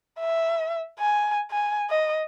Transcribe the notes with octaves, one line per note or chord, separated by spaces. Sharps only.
E5
G#5
G#5
D#5